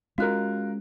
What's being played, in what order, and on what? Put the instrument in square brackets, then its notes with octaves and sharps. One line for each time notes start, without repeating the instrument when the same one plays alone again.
[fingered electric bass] G#3 C#4 [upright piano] F4 A#4 [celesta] F#4 F#6